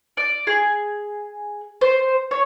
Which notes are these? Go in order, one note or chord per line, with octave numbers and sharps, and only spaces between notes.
D5
G#4
C5
C#5